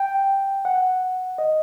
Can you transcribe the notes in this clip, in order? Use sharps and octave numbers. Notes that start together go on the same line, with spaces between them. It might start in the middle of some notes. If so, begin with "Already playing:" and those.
Already playing: G5
F#5
D#5